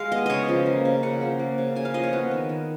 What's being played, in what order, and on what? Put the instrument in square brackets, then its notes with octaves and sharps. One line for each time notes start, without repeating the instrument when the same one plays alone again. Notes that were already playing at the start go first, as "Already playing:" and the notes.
Already playing: [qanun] G#3 F5
B3 D#5
C#3 C#5 D#5
F3
A#3
C#3
C#3 F#5
F3
A#3
C#3
C#3 G#5
F5
F3 D#5
C#5
B3 B4
D#3
D#3